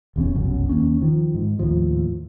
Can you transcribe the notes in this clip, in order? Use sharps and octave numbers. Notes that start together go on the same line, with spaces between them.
D#1 E2 E3 C#4
F1 B1 F#2
D#2 G#2 A#3 C#4
D#3 F3
G#2
D#2 A2 F3